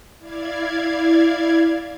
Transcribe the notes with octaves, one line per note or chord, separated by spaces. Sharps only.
E4 D5 F5 G#6